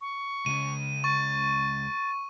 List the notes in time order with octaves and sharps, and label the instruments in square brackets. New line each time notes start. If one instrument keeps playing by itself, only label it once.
[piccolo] C#6
[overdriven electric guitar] C#2 C#3 [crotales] D#7
[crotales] C#6 [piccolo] A6